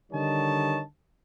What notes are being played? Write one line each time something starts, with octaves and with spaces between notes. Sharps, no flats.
D3 D#3 G3 C#5 D#5 A5